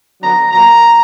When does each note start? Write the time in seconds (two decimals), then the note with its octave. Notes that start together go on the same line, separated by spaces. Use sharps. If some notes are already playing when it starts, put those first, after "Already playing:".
0.20 D3 F#3 B3 D4 A#5
0.51 A#2 F#3 A#3 A#5